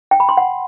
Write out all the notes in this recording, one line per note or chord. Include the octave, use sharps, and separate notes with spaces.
G5
B5
C6
F#5